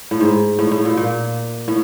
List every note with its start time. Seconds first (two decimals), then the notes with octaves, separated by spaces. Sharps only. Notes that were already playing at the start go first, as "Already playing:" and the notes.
0.11 A2
0.20 G#2
0.59 A2
0.71 A2
0.85 A#2
0.97 A#2
1.68 A2